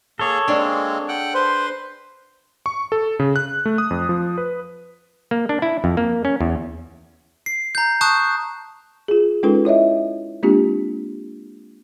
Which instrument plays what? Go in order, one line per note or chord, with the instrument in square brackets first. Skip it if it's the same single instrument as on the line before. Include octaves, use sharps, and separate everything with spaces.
[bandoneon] A#3 G#4 [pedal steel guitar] A4 C#5
[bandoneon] G#3 A#3 C4 [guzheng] D4 G#4
[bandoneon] F#5 G5 F#6
[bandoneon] B4 C6 [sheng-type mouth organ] C5
[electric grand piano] C#6
A4
C#3
F#6
A3
D#6
F2
F3
B4
[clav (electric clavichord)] A#3
D4
E4
F2
A#3
C#4
E2
[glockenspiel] C7
A#5 G6
A5 C#6 D#6 F#6 G6
[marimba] F4 G#4
G#3 C#4 D#4 F4 A4 B4
E4 C#5 D#5 E5
G#3 A#3 C4 D4 F4 G4